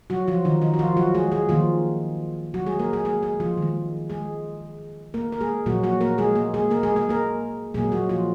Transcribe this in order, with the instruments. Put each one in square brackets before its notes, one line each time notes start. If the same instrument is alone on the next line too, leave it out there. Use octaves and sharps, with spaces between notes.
[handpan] F#3 F#4
F3 F4
D#3 D#4
D#3 D#4
F#4
F3 F4
F#3 F#4
G#3 G#4
G#3 G#4
D#3 F3 A#3 F4
F#3 F#4
G#3 G#4
A#3 A#4
G#3 G#4
G#3 G#4
G#3 G#4
F3 F4
D#3 G#3
G#3 G#4
A#3 A#4
A#4
G#3 G#4
A#2 F3 F#3 A#3 F#4
F#3 F#4
A#3 A#4
G#3 G#4
A#3
G#3 G#4
A#3 A#4
G#3 G#4
G#3 G#4
A#3 A#4
A#2 F#3 G#3 A#3 G#4
F#3 F#4
F3 F4